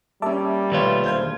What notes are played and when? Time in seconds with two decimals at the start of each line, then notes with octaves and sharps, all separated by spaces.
0.22 G3 A#3 C#4 E5 A5 D6
0.72 D#2 B2 A3 F4 B4 C#5 E5
1.04 E1 C5 F5 G6 G#6